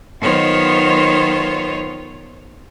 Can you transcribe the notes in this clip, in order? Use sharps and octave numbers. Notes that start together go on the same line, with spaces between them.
D#3 F#3 B3 F4 C5 C#5